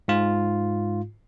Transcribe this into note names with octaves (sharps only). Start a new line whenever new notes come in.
G#2 F4